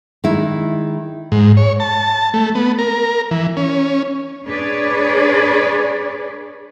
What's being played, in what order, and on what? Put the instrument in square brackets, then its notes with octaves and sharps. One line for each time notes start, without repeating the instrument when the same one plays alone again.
[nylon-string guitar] D#3 G#3 E4
[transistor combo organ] G#2
C#5
A5
A3
B3
A#4
E3
C#4
[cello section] D4 G#4 B4 C#5 D5